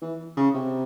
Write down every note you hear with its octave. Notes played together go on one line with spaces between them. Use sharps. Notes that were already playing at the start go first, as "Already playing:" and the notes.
E3
C#3
C3